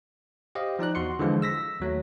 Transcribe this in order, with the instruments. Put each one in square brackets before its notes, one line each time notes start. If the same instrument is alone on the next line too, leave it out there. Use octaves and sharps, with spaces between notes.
[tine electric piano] G4 C5 D#5 F5
F3 D#4 D5 F#6
E2 F#4 C6 C#7
D3 E3 F3 G#3 F4
E6 A#6 B6
D#2 F#3 A3